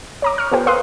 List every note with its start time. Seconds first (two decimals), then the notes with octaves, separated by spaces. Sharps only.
0.22 C#5 A#5 D6
0.38 C#6 F6
0.52 B3 F4 G4 A4 C5 G5
0.66 A#4 B4 F5 C6 D#6 F#6